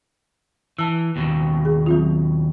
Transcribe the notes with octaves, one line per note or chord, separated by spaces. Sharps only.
E3 A5 E6
D#2 B2
G#4
F#3 C4 F4